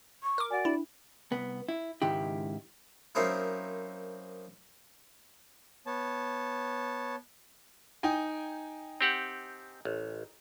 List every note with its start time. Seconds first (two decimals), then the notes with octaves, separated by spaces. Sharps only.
0.23 C#6
0.38 A#4 D6
0.51 F#4 D5 F#5 G#5
0.65 D4 E4
1.31 C2 B3
1.68 E4
2.02 C#2 G#2 D#3 E4 G4
3.15 F#2 A#3 C4 D#4 E4
5.86 B3 C#5 A5
8.03 D#4 G5 G#5
9.01 C4 G4 F#5
9.85 A1